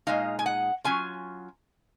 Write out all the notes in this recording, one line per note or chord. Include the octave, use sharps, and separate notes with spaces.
A#2 G#3 D#4 F5
G#5
F#5
F#3 C#4 F4 G#5